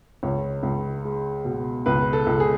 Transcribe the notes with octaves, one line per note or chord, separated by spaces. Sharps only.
C#2 C#5
C#2
G#3
B2
C#2 B4
A4
C#2
G#4